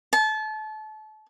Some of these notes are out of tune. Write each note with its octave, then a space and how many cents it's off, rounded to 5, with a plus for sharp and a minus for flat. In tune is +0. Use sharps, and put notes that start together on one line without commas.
A5 -30